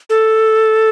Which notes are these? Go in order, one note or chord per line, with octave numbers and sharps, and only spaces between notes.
A4